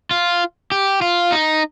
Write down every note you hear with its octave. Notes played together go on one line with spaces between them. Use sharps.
F4
G4
F4
D#4